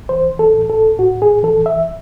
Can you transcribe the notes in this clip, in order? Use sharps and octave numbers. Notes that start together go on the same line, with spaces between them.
E3 C5
A4
A2
A4
A2 F#4
G#4
E3 A4
E5